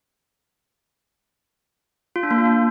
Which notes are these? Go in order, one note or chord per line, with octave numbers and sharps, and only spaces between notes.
F4
D4
A#3